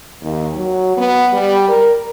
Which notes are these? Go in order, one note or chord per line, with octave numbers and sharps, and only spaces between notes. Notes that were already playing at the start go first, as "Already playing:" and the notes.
D#2
F#3
B3
G3
A#4